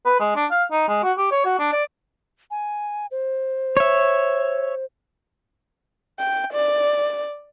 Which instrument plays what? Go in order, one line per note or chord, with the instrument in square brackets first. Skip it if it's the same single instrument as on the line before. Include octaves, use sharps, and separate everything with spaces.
[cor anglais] B4
G#3
D4
F5
D#4
G#3
F#4
G4
C#5
F#4
D4
D5
[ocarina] G#5
C5
[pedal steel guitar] C#5 E5
[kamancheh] G5
D5